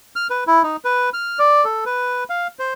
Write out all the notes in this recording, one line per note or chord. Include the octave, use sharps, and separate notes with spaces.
F6
B4
E4
D#4
B4
F6
D5
A4
B4
F5
C5